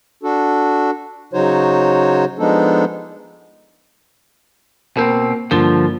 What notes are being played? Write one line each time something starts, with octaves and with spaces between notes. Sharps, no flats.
D4 F#4 A4
C#3 F#3 D#4 F#4 C5 C#5
F3 G#3 B3 D4 D#4 A4
B2 A#3 C4 A#4
G2 D3 F3 A#3 G7